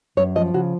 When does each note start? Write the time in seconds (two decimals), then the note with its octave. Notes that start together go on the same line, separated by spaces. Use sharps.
0.17 F#2 C#5
0.36 F3 D#5
0.54 C#3 F#4